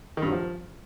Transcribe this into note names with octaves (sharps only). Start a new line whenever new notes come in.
D#3
G2
F#3
F3